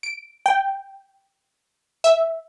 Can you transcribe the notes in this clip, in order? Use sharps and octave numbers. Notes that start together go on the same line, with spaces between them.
D7
G5
E5